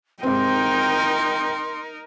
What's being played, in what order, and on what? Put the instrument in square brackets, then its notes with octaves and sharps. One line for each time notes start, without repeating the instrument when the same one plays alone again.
[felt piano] G#2 C3 C4 [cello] D#4 A#4 [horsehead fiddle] G5 [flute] C6